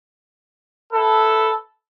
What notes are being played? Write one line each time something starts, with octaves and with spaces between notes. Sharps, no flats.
E4 A4 B4